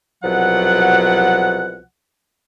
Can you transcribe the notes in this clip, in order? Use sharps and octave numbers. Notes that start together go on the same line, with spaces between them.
C2 B2 F3 F#3 F#5